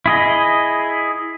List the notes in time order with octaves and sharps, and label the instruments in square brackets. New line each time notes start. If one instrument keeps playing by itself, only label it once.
[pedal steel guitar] E4 G#4 D#5